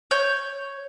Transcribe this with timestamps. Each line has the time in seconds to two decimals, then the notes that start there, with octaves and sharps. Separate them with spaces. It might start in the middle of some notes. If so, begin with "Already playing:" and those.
0.11 C#5 G6